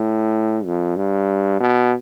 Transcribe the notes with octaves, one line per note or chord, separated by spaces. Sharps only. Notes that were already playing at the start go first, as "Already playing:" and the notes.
Already playing: A2
F2
G2
B2